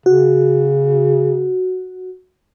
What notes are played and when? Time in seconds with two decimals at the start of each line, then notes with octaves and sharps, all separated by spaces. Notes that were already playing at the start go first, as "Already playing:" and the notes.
0.06 C#3 F#4